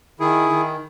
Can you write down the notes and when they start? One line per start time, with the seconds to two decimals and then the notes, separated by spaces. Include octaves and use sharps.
0.20 D#3 E4 G#4
0.49 D#3